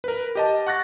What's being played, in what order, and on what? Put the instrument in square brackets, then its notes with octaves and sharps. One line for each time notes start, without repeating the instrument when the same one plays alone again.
[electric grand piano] A#4 B4
G4 D#5 A5
F#5 C#6 F#6 A6 A#6